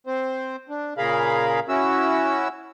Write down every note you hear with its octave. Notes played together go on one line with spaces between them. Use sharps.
C4 C5
D4
A#2 C#3 G#4 A#4 F5 B5
C#4 E4 F#4 E6